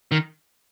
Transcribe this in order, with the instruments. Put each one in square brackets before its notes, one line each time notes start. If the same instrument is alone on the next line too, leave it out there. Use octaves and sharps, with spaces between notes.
[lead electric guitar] D#3